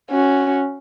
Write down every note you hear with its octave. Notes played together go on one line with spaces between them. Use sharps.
C#4 F#4